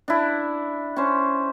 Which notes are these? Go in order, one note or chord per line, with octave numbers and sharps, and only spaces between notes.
D4 E4
C#4 C5